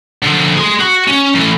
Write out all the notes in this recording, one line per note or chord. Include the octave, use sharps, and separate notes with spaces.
D3 F3
G#4 C6
F#4
C#4
A2 E3